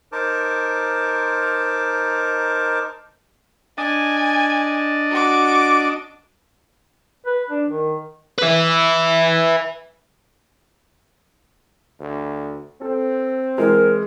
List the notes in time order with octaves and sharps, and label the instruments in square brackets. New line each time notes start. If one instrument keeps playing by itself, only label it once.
[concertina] D#4 A#4 C5 A5 D6
[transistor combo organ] D4 D#5 A5 [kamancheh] G#5
[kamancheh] F#4 D6
[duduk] B4
D4
D#3
[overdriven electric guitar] B4 E5
[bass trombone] D2
[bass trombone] C4 [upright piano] A4
[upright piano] E3 G#3 [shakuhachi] A#4